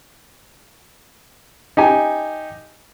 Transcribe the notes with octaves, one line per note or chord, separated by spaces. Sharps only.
D#4 G4 G#5